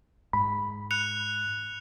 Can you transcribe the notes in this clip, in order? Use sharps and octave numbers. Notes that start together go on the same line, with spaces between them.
G#2 B5
F#6 C#7 F7